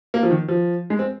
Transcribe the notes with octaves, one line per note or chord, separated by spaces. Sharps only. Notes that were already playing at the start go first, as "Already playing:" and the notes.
A#3
F3
D#3
F3
G#3
C4